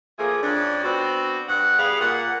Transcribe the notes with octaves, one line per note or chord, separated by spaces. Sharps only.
F3 A3 A#3 G#4
F2 C#4 D4
B3 C4 D4 F#4
G2 F#5
G3 B3 G#4 F5
A#2 F#5